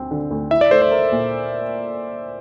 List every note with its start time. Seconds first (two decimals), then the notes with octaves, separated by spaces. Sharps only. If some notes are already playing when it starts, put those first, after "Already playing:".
Already playing: D2 C4
0.11 D3
0.31 D2
0.51 E4 E5
0.61 D5
0.71 A3 C5
0.82 C5
0.91 A#4
1.12 A#2